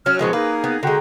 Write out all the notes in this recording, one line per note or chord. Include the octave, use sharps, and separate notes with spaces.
F#3 C#4 F#4 F6
C2 A#2 F3 G#3 B3 F#4
A#3 D#4 G#4 B4
B3
D3 G#3 F#4 G5 A#5